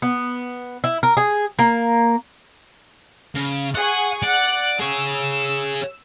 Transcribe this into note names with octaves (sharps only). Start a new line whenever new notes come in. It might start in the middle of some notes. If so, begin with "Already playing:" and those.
B3
E4
A#4
G#4
A#3
C#3
G#4 F#5 G#5 C#6
D5 F#5 F#6
G#4 C#5 E6